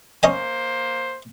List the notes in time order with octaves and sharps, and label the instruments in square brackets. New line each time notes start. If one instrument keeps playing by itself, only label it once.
[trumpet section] A#3 C5 [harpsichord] C#4 D#5 G#5